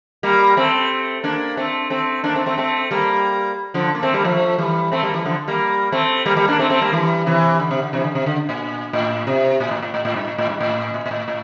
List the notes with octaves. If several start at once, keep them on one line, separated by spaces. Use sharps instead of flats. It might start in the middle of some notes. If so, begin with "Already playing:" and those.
G3 A#3
A3 C4
A#3 D4
A3 C4
A3 C4
A#3 D4
A3 C4
A3 C4
A3 C4
G3 A#3
D3 F3
A#3
A3 C4
G3 A#3
F3 A3
E3 G3
A3 C4
G3 A#3
E3 G3
D3 F3
G3 A#3
A3 C4
G3 A#3
G3 A#3
A#3 D4
A3 C4
A3 C4
G3 A#3
E3 G3
C3 E3
D3
C3
D3
C3 E3
D3
C3
D3
A#2
A2
C3
A#2
A2
A2
A2
A2
G2
A2
A2
G2
A2
A#2
A#2
A2
A2